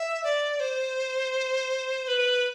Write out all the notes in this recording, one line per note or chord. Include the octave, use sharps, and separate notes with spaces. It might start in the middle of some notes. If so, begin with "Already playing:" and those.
Already playing: E5
D5
C5
B4